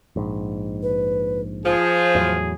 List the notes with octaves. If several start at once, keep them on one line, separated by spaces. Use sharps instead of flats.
A#1 G#2
B4
F3 G#4 C5
E2 A2 F#3